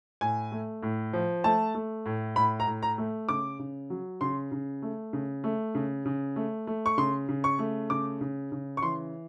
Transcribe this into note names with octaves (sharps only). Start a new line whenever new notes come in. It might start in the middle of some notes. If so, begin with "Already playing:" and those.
A2 G#5
A3
A2
F3
A3 A5
A3
A2
A2 B5
A#5
A2
A#5
A3
C#3 D6
C#3
F#3
C#3 C6
C#3
A3
C#3
A3
C#3
C#3
A3
A3
C#6
C#3 C6
C#3
C#6
A3
C#3 D6
C#3
C#3
C#6
E3 C6